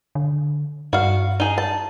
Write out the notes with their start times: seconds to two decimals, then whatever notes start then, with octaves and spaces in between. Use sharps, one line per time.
0.15 D3
0.93 G2 F#4 F5
1.40 D#4 G#4
1.58 A5